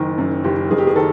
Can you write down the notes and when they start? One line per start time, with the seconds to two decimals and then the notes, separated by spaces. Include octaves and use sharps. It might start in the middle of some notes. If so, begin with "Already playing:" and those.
Already playing: F#1 D#3
0.18 F#2
0.44 F#1 G4
0.70 F#1 G#4
0.78 G4
0.87 G#4
0.96 D#3 A4